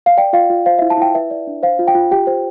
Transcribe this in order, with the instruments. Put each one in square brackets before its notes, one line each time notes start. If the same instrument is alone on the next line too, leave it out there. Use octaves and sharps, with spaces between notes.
[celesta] F5
D5 G5
F4 F5
F4
C5 F5
E4 E5
A5
E4 G5
B4 E5
D5
D4
C5 F5
F4
G5
F4
G4 G5
C5